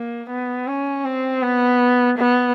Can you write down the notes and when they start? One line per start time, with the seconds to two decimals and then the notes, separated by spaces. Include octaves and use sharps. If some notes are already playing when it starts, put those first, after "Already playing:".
Already playing: A#3
0.30 B3
0.67 C#4
1.05 C4
1.42 B3
2.18 B3